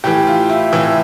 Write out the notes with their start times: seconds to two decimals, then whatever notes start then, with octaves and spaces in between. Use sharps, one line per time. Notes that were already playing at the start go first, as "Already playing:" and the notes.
0.04 A2 E3 G4
0.27 F4
0.49 E4
0.73 A2 E3 E4